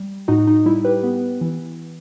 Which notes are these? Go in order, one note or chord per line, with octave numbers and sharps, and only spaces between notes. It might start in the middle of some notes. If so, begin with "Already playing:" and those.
Already playing: G3
A2 D#4 F#4
D#4
G3 E4
G4 B4
B3
E3